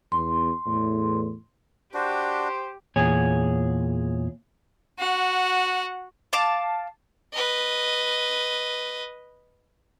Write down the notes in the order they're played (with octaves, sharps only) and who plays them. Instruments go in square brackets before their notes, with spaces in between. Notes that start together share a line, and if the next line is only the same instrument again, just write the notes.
[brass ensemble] E2 [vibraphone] C6
[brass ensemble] E2 A2
[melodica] D4 F#4 [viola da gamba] G4 [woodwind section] C5
[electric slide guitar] E2 A#2 G#4 C#5 G#5
[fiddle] F#4 F#5
[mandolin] F5 A5 D6
[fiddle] B4 D#5